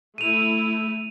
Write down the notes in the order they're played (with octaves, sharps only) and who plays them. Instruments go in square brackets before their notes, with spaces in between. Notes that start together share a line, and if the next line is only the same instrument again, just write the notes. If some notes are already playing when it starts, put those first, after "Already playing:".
[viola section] A3 E4 [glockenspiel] D#7 F7